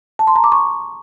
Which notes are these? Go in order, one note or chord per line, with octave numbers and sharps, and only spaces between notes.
A5
C6
A#5
D6
C#6